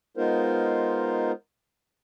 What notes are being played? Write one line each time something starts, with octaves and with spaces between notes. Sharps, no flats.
G#3 B3 D#4 F4 A#4 C5